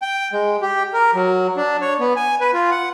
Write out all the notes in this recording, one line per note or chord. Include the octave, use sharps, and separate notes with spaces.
G5
G#3
G4
A#4
F#3
D4
C#5
B3
G#5
B4
F4
F#5